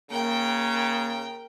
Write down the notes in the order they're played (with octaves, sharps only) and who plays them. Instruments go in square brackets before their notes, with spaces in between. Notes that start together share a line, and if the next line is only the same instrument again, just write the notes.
[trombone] C#3 [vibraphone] A#3 [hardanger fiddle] A#4 G5